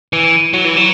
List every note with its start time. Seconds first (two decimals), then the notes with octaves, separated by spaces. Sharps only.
0.13 E3
0.54 F#3
0.65 E3
0.77 F#3